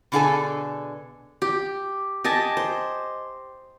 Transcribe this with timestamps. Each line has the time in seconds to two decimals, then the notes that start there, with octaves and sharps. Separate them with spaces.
0.12 B2 D3 E4 G#4 A4 G#5
1.42 G4
2.24 G4 D#5 G#5 A5
2.57 C5